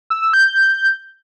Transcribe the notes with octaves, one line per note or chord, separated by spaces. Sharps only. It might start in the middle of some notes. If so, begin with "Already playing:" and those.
E6
E6
G6